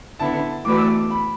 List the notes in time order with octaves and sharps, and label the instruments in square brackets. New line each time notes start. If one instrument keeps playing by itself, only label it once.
[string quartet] D3 B3 E4 [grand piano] A5
[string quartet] E3 A3 F#4 B4 D5 [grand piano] D6
[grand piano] E6
D6
B5